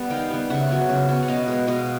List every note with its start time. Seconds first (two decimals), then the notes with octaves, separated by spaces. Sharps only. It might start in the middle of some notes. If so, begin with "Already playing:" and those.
Already playing: G3 B3
0.10 D#3 F5 G5
0.31 G3 B3
0.50 C#3 E5 F#5
0.69 F#3 B3
0.89 C#3
1.09 F#3 B3
1.23 F#5
1.28 B2 D#5 F5
1.48 G#3 B3
1.68 B2 D#5 F5